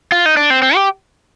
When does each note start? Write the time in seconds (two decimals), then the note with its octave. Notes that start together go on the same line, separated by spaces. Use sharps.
0.12 F4
0.26 D#4
0.37 D4
0.50 C4
0.62 C4
0.75 G4